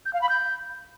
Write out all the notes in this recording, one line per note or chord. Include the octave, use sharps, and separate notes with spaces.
G6
F5
B5
G6